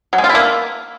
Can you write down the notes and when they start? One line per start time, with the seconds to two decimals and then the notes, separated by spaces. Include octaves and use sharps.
0.13 F#3
0.18 G#3
0.24 F4
0.29 E4
0.35 A#3